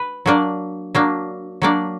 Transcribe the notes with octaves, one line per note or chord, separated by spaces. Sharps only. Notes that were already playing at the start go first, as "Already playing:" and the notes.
Already playing: B4
F#3 A#3 D4 D5
F#3 A#3 D4
F#3 A#3 D4 D5